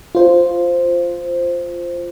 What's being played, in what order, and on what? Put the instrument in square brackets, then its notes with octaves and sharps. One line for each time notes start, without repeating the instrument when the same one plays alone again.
[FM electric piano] F4 C5